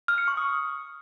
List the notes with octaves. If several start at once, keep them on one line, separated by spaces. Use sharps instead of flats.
F6
C#7
C#6
D#6